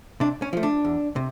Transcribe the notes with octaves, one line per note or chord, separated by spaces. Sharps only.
C3 D4
C#4
F3 A3
D4
E2
C3